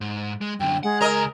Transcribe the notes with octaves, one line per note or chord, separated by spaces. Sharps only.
G#2
G#3
F#2 D3 G5
G#3 F#5
C#2 A#4 D#5 A#5